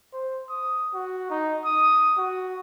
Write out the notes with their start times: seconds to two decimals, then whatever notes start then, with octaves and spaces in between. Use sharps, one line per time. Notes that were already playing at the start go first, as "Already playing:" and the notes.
0.13 C5
0.50 D#6
0.94 F#4
1.30 D#4
1.65 D#6
2.18 F#4